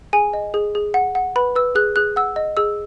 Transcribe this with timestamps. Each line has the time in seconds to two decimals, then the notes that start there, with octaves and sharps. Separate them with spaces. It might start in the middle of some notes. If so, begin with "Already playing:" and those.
0.13 G#4 G#5
0.33 D#5
0.54 G#4
0.75 G#4
0.94 F#5
1.15 F#5
1.36 B4 B5
1.56 B4 E6
1.75 G#4 F#6
1.96 G#4 F#6
2.16 F#5 E6
2.36 D#5
2.57 G#4 E6